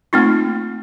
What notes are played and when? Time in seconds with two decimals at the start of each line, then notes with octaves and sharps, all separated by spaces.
0.13 A3 A#3 C4 D#4 F4